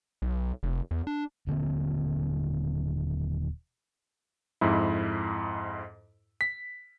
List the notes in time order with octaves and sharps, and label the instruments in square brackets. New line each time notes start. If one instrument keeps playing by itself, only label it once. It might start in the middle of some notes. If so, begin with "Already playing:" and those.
[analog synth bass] B1
F1
E2
D4
[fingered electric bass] D#1 D3 A#3 C4
[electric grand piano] F2 G#2 E4
B6